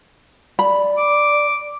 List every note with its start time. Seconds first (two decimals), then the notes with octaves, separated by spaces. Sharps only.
0.59 D5 B5
0.98 D6